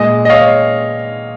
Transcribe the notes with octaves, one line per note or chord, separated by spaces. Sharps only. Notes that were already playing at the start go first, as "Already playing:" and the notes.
Already playing: A#2 G#3 D#5
D#5
C#5 F5